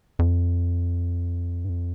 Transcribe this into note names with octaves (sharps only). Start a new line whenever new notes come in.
F2
G2
F2